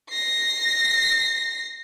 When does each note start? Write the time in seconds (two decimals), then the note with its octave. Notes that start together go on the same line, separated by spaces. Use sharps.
0.11 A#6 C7